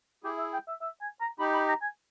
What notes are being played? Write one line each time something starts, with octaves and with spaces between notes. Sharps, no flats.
E4 G4 G#4
E5
G5
E5
E5
G#5
A#5
D#4 G4 B5
B5
A#5
G#5